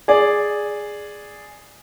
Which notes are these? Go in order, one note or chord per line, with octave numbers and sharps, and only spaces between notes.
G#4 D5